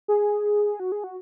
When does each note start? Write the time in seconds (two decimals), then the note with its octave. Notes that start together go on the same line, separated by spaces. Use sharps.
0.08 G#4
0.80 F#4
0.92 G#4
1.04 F#4